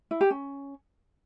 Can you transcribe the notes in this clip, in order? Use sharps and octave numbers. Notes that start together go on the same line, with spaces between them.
E4
G4
C#4